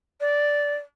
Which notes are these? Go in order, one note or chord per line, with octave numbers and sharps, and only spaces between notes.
D5